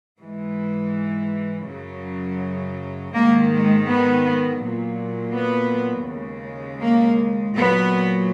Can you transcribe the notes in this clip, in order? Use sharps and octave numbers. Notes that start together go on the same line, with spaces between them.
G#2 E3 G#3
F#2 C#3 F#3
G#2 D#3 G#3 A#3
G#3
B3
A#2 F#3
B3
D#2 C#3 G#3
A#3
A#2 F#3 B3